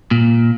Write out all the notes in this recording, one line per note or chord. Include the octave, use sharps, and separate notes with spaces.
A#2